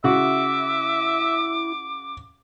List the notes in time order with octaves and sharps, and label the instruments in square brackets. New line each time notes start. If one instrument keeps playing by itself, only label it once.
[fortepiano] C#3 F#4 [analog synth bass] E4 [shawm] E5 [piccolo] D6